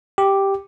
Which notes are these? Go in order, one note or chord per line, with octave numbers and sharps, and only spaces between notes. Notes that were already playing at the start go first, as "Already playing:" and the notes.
G4